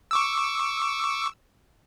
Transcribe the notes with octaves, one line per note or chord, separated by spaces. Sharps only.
C#6 D6 E6